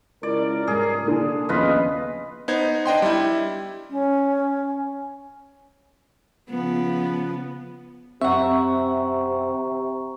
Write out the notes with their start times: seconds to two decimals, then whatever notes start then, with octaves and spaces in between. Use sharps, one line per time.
0.23 C#2 E4 A#4 D5
0.68 G#2 G3 G#4
1.06 A#2 D3 D4
1.49 D#2 C#3 F3 B3 F4 B4 D#5
2.48 B3 D#4 C5 G#6
2.85 D4 D#5 G5 C6
3.02 G3 E4
3.90 C#4
6.49 C#3 F3 B3
8.21 F#2 C3 C4 E5 F#5 A#5 C#6